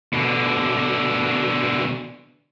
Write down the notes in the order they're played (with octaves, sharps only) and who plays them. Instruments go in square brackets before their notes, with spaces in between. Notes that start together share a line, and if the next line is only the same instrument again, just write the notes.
[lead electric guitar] B2 D3